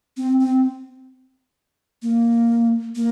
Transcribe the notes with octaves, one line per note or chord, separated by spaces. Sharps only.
C4
C4
A#3
A#3